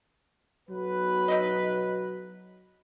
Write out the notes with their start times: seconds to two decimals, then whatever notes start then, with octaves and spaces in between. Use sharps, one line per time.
0.70 B1 F#3 B4
1.28 D#4 E4 D#5